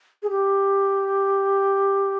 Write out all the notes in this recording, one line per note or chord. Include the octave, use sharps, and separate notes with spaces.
G#4
G4